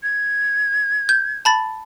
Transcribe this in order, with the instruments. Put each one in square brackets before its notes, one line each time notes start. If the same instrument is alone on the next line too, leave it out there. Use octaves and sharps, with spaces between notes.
[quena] G#6
[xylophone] G6
A5 B5 A6